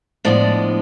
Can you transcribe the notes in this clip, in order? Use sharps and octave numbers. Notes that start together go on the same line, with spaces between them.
A2 F3 G#3 B3 D4 D5